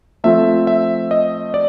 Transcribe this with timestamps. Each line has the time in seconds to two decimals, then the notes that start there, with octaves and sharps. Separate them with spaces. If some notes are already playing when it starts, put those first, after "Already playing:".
0.24 F3 A3 C4 F4 E5
0.67 E5
1.11 D#5
1.54 D5